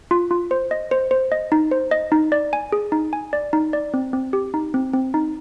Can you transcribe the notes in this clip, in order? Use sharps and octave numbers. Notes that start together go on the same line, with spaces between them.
F4
F4
C5
D#5
C5
C5
D#5
D#4
C5
D#5
D#4
D5
G#5
G#4
D#4
G#5
D5
D#4
D5
C4
C4
G4
D#4
C4
C4
D#4